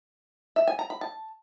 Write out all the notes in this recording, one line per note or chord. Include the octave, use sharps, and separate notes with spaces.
E5
G#5
A#5
B5
A5